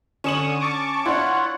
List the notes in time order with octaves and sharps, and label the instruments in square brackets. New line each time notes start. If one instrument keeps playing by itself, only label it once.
[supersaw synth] D3 C#6 D#6 [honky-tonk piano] C#4 E7 F#7
[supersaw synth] A5 C#6 D6
[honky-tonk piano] D4 E4 [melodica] F4 C#5 [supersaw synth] F#5